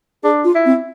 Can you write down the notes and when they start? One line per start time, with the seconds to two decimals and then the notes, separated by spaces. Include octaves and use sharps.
0.23 D4 G#4
0.44 F4
0.55 E4
0.65 C4